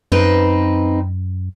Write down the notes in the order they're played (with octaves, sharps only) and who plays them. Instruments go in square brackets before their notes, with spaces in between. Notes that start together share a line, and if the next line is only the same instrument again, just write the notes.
[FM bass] F#2 [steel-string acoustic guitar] C4 D#4 B4